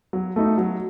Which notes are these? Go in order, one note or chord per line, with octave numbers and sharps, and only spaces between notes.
F#3
A3 D#4
F#3